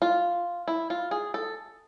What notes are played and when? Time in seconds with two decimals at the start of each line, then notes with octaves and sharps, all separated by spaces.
0.02 F4
0.68 E4
0.90 F4
1.11 G#4
1.34 A4